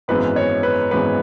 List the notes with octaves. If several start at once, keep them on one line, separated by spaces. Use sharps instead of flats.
G#1 F#2 E3 G#3 B3 B4
C#5
B4
G#1 F#2 E3 G#3 B3 B4